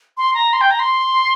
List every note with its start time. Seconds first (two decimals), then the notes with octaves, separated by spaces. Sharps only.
0.17 C6
0.34 A#5
0.53 C6
0.61 G5
0.71 A#5
0.79 C6